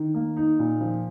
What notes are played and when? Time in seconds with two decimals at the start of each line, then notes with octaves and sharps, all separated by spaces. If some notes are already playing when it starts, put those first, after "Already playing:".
Already playing: D#3
0.14 A#3
0.37 D#4
0.59 A#2
0.81 F3